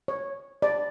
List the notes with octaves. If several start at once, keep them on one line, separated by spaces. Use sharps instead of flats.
C#5
D5